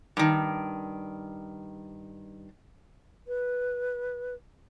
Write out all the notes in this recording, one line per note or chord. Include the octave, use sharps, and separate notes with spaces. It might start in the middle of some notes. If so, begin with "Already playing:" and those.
G2 D#3
B4